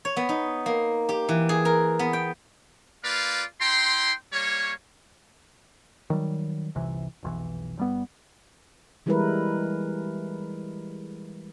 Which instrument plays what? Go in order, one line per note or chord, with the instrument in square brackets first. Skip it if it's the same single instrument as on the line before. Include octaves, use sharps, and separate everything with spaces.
[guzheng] C#5
B3
D#4
A#3
G4
E3
G#4
A#4
B3
G5
[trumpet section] A#3 F4 B4 D5 F5
E4 G5 A#5 C6
G3 A#3 C#5
[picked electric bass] D#3 F#3 G3
G1 C2 C3 E3
F1 B1 E3
G1 G3 B3
[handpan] E3 G3 G#3 E4 A#4 B4